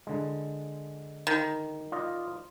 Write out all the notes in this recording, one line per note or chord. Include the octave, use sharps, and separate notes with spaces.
D3 G#3
D#3
F4 D5 D#5